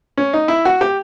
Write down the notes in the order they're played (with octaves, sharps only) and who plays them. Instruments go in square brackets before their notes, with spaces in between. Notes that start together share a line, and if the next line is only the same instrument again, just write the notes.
[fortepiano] C#4
D#4
E4
F#4
G4